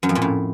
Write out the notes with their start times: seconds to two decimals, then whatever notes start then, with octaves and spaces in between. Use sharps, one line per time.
0.03 F#2
0.09 F2
0.15 A#2
0.22 A2